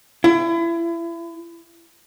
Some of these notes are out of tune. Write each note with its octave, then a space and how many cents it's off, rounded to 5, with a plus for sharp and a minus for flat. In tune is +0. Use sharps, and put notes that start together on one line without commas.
E4 +30